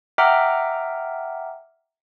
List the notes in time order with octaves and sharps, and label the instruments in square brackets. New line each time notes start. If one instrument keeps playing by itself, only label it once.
[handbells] E5 F#5 G5 A#5 D6 F6